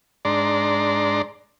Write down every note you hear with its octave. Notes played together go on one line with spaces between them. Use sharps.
G#2 D4 D5 A#5 C6